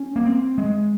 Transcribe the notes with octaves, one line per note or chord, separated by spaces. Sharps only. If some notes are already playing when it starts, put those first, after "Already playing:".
Already playing: C#4
A#3
C4
G#3